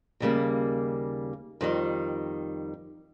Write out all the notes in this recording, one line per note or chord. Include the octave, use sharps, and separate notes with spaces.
D#2 C#3 G3 A#3
F2 D#3 G3